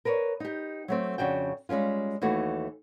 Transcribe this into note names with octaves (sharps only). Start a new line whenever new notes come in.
A#4 B4 C#5 D5
D#4 G4
F#3 A3 C4
F2 C#3 D4 F#4 G5
G3 G#3 A#3 C#4 F4
D#2 E3 A3 F#4